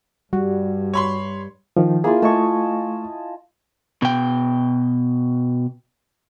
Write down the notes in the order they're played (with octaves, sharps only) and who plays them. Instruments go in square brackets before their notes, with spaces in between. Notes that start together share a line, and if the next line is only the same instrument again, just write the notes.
[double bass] G2 [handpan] G3 [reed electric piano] F#4
[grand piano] C#5 B5 C6
[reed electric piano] D#3 F3
[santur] A#3 E4 F4 [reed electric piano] G#4
[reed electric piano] A3 C#6 [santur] D#5 G#5 A5
[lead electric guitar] B2 G5